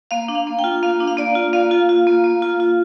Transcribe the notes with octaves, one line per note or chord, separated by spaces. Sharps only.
A#3 F5
D4
F5
A#3
G5
F4
A#3 F5
D4
F5
A#3 D5
F4
A#3 F5
F4
F4
A#3
A#3
F4
F4